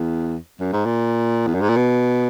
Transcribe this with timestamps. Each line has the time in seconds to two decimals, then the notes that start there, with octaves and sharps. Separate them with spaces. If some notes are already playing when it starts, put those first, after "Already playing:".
Already playing: E2
0.60 F#2
0.73 G#2
0.85 A#2
1.47 E2
1.54 F#2
1.61 G#2
1.69 A#2
1.76 B2